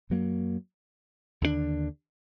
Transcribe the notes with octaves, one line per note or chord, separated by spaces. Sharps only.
F#2 F#3 A#3
D#2 D3 G3 D4